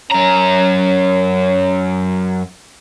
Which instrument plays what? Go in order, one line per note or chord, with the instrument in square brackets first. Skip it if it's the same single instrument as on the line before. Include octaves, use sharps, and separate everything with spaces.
[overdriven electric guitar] F#2 A#5 [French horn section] C#4 C#5